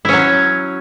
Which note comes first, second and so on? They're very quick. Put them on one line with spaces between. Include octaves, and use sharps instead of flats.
E4 C#4 F#3